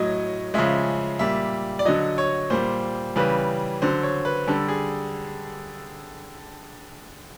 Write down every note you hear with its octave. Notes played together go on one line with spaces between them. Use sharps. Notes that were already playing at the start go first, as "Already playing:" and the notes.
Already playing: A2 F#3 D#5
C#3 F3 G#3 E5
A#2 G3 E5
D5
D3 F#3 D#5
C#5
A#2 G3 C5
C#3 E3 G3 B4
D3 F#3 C5
C#5
B4
D3 G3 A4
G#4